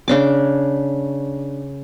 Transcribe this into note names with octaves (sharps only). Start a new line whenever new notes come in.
C#3 D4 D6